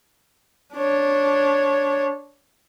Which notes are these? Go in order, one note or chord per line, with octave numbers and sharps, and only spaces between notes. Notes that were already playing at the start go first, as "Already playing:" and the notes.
D4 C#5